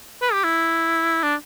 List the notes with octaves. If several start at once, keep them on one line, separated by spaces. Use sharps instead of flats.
B4
G4
E4
D4